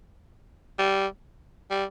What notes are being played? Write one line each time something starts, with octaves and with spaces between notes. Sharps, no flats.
G3
G3